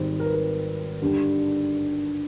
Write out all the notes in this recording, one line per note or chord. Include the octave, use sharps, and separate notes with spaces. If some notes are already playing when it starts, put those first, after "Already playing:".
Already playing: G#1 G#2 D#3 G3 C4 C5
A#4
B4
A#4
G2 D3 G3